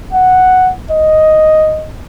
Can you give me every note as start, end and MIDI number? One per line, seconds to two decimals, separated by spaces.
0.13 0.72 78
0.91 1.88 75